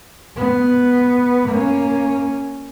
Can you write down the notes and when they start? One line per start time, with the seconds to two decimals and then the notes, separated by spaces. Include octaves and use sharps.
0.37 B3
1.49 A#3 C#4